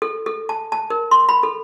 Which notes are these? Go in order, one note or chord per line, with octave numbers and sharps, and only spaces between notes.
A4
A4
A5
A5
A#4
C6
B5
A4